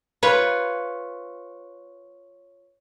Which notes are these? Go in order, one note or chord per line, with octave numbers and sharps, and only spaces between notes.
F4 B4 C#5